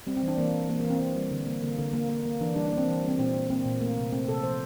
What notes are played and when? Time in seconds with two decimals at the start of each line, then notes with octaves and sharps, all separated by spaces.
0.07 G3 C4
0.17 C4
0.23 E3
0.28 D4
0.38 E3 A#3
0.53 E3
0.69 E3 A#3
0.80 A#3
0.85 E3
0.90 C4
1.00 A#3
1.16 G3
1.31 D3
1.46 A#3
1.62 D3 A#3
1.78 D3
1.93 A#3
2.09 A#3
2.26 A#3
2.41 E3 D4
2.56 G3 D4
2.67 D4
2.72 A#3
2.78 C4
2.88 E3
3.03 G3
3.08 C4
3.18 A#2 C4
3.34 A#3
3.50 A#3 C4
3.65 A#2
3.81 A3 A#3
3.97 C3
4.12 A3 C4
4.28 C3 A4
4.43 F3 C5